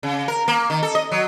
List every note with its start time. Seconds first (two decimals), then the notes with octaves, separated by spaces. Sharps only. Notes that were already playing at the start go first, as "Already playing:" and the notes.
0.03 C#3
0.28 A#4
0.48 A#3
0.70 D#3
0.83 A4
0.95 D#5
1.12 F#3